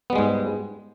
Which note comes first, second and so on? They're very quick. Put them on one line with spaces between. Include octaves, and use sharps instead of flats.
B3 G3 G#3 G#2